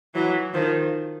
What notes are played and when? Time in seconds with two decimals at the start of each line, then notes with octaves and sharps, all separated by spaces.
0.14 E3 F#3
0.54 D#3 F3